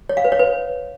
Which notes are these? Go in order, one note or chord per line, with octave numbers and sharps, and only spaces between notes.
C#5
F5
B4
C#5
B4